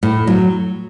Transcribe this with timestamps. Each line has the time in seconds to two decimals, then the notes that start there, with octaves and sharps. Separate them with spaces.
0.03 A2
0.27 F#3